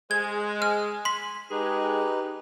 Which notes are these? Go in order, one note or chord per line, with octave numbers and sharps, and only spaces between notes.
G#3 C5 G#6
G#5 F6
C6 B6
G#3 D#4 G4 G#4 B4